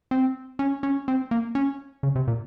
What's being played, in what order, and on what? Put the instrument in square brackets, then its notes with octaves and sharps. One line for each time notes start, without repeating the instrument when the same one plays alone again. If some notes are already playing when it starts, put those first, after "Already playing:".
[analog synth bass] C4
C#4
C#4
C4
A#3
C#4
C#3
C3
A#2